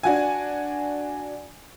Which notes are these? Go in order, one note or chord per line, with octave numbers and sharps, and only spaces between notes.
D4 F#4 G#5